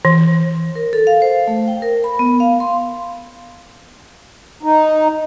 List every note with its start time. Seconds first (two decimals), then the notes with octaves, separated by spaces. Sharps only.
0.05 E3
0.75 A#4
0.93 A4
1.07 F5
1.22 C5
1.47 A3
1.68 G5
1.82 A#4
2.04 B5
2.19 B3
2.40 F5
2.60 C6
4.63 D#4